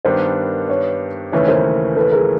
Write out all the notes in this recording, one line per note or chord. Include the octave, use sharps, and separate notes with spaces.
G2 D#3 G3 B3 D4 A#4 C5
B4 C#5
D#2 C#3 E3 A3 C#4 B4 C#5
A#4 C5
A4 B4
G#4 A#4